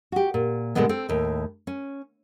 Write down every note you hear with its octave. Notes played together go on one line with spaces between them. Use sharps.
F#4 G4
A#2
A#2 D3 E3 G3 G#3 B3
C4 A4
D#2 A2
C#4